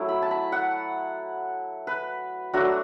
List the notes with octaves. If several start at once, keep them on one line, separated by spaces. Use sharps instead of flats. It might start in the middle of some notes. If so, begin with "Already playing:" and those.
Already playing: F#3 A3 E4
B5
A5
B5
F#5
B4
F#3 A3 D4 F#4